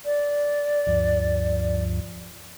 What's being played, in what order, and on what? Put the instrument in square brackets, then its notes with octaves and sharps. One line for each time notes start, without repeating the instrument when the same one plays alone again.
[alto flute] D5
[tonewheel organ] D2 G2 F3